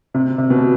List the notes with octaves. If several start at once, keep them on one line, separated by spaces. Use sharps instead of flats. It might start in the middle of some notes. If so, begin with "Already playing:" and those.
C3
C3
B2